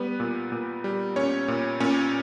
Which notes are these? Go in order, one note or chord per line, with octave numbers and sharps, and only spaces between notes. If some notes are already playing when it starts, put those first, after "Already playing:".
Already playing: G3 B3 B4
A#2
A#2
G3
A#2 C#4 C#5
A#2
A#2 C#4 C#5